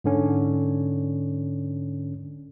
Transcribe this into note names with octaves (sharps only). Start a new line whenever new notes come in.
G#2 D3 C#4